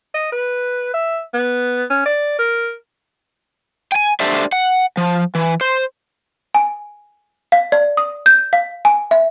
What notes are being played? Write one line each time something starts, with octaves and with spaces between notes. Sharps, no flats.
D#5
B4
E5
B3
C#4
D5
A#4
G5 G#5
D4 G4 A4 C5 D5 E5
F#5
F3
E3
C5
G#5
F5
D5
D#6
G6
F5
G#5
E5